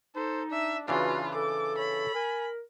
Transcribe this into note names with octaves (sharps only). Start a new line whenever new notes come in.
D#4 A4 C5
D4 E5
C#3 E3 D4 F4 F#4 B4
A4 D6
C#5 B5
A#4 G#5